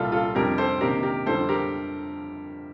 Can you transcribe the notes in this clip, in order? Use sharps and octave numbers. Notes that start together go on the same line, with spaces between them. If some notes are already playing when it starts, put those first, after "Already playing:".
Already playing: C2 A#2 G3 F4 A4
F4 A4
F2 C3 G3 D4 G4 A#4
A4 C5
C3 D#3 A#3 D4 G4 A#4
G4 A#4
F2 D3 G3 A4 C5
G4 A#4